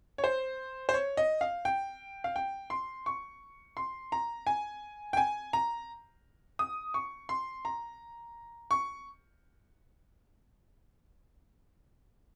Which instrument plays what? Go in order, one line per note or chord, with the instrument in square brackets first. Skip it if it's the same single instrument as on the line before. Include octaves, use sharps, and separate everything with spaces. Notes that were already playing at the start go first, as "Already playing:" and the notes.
[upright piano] C#5
C5
C5
C#5
D#5
F5
G5
F5
G5
C6
C#6
C6
A#5
G#5
G5
G#5
A#5
D#6
C#6
C6
A#5
C#6